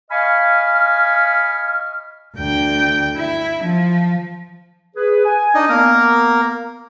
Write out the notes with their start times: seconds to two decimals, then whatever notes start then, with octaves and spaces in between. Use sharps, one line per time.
0.11 D#5 F5 G#5 B5 C#6 F6
2.36 D2 G5
3.16 E4
3.63 F3
4.96 G#4 B4
5.25 G#5
5.55 D4 D#4 D#5
5.69 A#3 B3 A#4